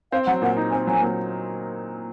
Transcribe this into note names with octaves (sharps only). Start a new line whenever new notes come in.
C4 F5
F#3 F#5
A#2 F#5
D#4
C4 G#5
F#3 G#5
A#2